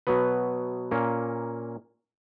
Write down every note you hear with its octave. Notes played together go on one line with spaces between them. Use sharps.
B2 F#3 B3 B4
A#2 A#3 C#4